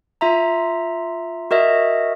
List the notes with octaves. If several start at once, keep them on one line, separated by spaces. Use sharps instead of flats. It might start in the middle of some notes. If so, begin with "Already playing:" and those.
F4 E5 A#5
F#4 A#4 D#5 E5